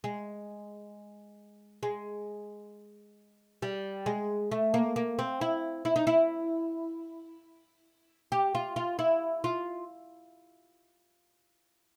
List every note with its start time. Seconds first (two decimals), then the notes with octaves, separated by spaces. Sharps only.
0.04 G#3
1.83 G#3
3.62 G3
4.06 G#3
4.51 A3
4.74 A#3
4.96 A#3
5.19 C4
5.41 E4
5.85 E4
5.96 D#4
6.07 E4
8.32 G4
8.55 F4
8.76 F4
8.99 E4
9.44 F4